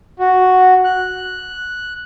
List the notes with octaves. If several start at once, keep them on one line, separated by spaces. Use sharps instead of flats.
F#4
F#6